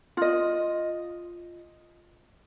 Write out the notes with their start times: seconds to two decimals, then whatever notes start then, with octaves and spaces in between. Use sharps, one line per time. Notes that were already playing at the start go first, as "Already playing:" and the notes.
0.17 F4 D#5